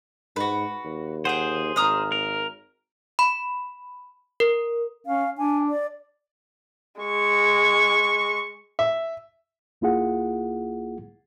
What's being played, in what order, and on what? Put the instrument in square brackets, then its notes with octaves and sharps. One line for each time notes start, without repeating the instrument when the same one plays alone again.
[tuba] G#2 [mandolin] F#4 B4
[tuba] D#2
[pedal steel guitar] G#4 C5 [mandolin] F#5 G5
[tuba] G#1 [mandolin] A#5 D#6 F6
[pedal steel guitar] A#4
[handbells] B5
A#4
[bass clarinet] C#4 [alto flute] F5
[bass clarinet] D4 [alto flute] G#5
[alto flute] D5
[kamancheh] G#3 C#6
[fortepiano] E5
[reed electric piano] C2 A#3 E4 F4 G#4 F#5